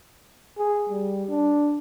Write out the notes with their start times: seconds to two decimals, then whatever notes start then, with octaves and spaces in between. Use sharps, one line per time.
0.58 G#4
0.89 G3
1.29 D4